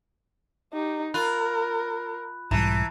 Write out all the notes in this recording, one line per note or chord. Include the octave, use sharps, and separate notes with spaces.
D#4 G4
F4 A#4 B5 F#6
B1 G#2 E3 G3 A5 A#5